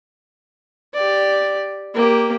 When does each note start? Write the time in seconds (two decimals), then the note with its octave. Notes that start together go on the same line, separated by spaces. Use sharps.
0.94 G4 D5
1.95 A#3 G4